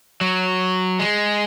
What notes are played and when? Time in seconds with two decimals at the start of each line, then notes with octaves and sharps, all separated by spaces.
0.21 F#3
0.99 G#3